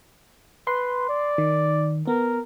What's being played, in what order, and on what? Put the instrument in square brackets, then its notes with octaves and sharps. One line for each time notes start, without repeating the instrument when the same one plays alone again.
[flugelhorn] B4 [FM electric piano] C6
[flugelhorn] D5
[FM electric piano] D#3
[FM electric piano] B3 [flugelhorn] A#4